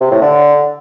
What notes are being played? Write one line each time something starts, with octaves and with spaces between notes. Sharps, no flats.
C3
A2
D3